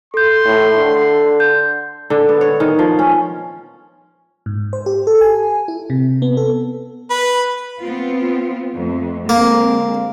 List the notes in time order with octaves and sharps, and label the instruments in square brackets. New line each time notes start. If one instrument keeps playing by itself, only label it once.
[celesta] A4 G6 [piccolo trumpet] C6
[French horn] A2
D3
[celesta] G6
[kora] D3
B3
C#5
D#3
F3
C#4
[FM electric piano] G#2
C5
G4
A4
G#5
E4
C3
B3
A4
[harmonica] B4
[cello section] B3 C4 F4
F2 A3
[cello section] D3 G#3 C4 [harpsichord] A#3